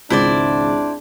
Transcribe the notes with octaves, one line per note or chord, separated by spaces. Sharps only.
G#1 C#2 D4 E4 C5 D5